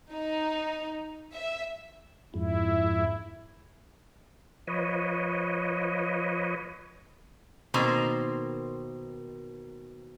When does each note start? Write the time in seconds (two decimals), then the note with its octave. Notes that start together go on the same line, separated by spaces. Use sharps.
0.12 D#4
1.32 E5
2.34 F2 G#2 E4
4.67 F3 B4 C#5 D#5
7.74 B2 D#3 A#3 C4 C5 A#5